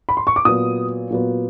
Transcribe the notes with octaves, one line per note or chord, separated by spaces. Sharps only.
B5
C6
C#6
D6
A#2 F#3 B3 D#6
A#2 F#3 B3